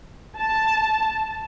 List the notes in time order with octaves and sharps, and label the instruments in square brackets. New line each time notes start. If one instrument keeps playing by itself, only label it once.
[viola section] A5